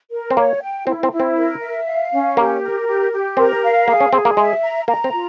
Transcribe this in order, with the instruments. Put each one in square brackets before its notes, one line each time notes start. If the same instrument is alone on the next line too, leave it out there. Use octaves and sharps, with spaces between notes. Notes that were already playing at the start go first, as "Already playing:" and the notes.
[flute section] A#4
[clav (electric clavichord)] C4
[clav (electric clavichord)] A#3 [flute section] C#5
[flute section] G5
[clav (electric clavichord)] C4 [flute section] E4
[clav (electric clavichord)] C4
[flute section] E4
[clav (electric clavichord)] C4
[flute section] A#4
E5
F5
C#4
[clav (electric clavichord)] A#3 [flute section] G4
[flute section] A#4
G4
G4
[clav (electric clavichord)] C4 [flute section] A#4
[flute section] F5
[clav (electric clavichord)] A#3 [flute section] G#4
[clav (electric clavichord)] C#4
[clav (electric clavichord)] C4 [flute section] G#4
[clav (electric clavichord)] A#3
[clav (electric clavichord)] G#3 [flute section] E5
[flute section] A#5
[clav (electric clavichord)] A#3 [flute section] A#5
[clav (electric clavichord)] C4
[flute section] F4